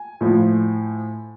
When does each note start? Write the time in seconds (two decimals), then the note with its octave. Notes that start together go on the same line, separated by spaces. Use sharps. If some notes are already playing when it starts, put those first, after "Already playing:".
Already playing: G#5
0.21 A2 F3